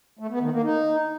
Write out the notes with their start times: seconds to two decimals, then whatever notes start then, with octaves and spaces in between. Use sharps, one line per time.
0.19 A3
0.30 B3
0.41 D#3
0.52 A#3
0.63 D#4